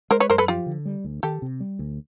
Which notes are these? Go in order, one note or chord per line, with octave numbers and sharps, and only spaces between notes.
G#3 A#4 C5
B4 C#5
F#2 A#4 C5
A4 B4
F3 F4 G4
D3
G3
D2
D#3 G4 A4
C3
G3
D2